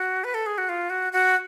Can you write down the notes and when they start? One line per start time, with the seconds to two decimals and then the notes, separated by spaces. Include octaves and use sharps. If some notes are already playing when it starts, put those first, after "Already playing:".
Already playing: F#4
0.24 B4
0.34 A4
0.46 G#4
0.58 F#4
0.69 F4
0.90 F#4
1.13 F#4